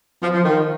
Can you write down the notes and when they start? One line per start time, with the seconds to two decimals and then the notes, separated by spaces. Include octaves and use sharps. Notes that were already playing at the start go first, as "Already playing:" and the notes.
0.22 F3
0.34 F3
0.44 D#3